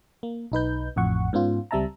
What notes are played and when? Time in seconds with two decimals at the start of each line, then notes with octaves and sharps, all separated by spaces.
0.23 A#3
0.52 B1 D#4 B4 G6
0.96 A1 F2 A2 F#5 C#6
1.33 G#2 B3 C#4 F4
1.71 C#2 G3 C4 E5 A5 A#5